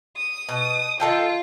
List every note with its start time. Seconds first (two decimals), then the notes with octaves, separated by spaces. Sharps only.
0.17 D#6
0.49 B2
1.00 D#3 F4 A4 G5